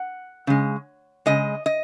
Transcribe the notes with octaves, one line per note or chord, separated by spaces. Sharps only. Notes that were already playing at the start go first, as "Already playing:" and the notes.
Already playing: F#5
C#3 G#3
C#3 G#3 D#5
D#5